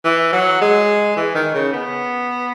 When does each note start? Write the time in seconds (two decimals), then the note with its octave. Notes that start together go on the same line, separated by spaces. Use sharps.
0.05 E3
0.32 F#3
0.61 G#3
1.17 E3
1.35 D#3
1.54 C#3
1.73 B3